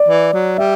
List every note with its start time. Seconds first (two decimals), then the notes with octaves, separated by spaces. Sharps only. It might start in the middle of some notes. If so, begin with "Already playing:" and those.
Already playing: D5
0.09 E3
0.33 F#3
0.58 G3 E5